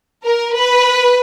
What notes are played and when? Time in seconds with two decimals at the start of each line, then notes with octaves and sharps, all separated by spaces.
0.24 A#4
0.56 B4